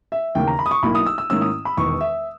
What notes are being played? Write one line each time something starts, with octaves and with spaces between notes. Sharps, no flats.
E5
D#2 C#3 E3 A#3 E4 G5
A#5
B5
D#6
C#6
B1 B2 A#3 E4 B5
D#6
E6
E6
G#2 D#3 A#3 C#4 E4 E6
D#6
B5
E1 E2 D#3 C#6
E5